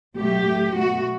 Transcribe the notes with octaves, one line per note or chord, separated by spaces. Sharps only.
B2 F#3 A3 G4
A2 F#3 A3
B2 A3 F#4